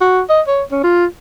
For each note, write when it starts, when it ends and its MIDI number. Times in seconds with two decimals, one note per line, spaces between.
0.01 0.22 66
0.29 0.41 75
0.47 0.62 73
0.72 0.80 61
0.84 1.05 65